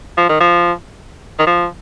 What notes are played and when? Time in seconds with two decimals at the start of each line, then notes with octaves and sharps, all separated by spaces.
0.18 F3
0.29 D#3
0.40 F3
1.39 D#3
1.47 F3